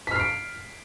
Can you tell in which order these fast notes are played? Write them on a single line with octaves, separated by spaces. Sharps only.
B6 F6 C7 D7